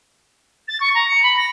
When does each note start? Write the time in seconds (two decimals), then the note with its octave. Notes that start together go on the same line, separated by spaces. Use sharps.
0.68 A6
0.80 C#6
0.94 A#5
1.08 C#7
1.22 B5
1.37 A#6